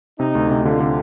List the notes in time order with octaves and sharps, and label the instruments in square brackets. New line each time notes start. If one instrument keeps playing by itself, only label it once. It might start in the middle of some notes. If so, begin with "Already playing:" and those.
[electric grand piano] C3 [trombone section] D#4
[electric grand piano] D2
C3
[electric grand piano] D3 [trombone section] F4
[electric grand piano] D3